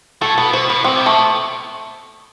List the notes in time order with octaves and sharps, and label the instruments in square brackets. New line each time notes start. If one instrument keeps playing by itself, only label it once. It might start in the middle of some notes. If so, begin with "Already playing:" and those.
[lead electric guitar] A2 [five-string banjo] A4
[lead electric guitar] B2 [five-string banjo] B4
[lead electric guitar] B2 [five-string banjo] C5
[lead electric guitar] A2 [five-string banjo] B4
[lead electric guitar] B2 [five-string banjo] C4
[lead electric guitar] C3
[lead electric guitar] B2 [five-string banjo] A3